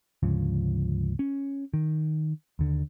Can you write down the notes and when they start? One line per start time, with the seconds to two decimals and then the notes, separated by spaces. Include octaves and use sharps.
0.23 D2 G#2 C#3 F3
1.19 C#4
1.74 D#3
2.59 D#2 D3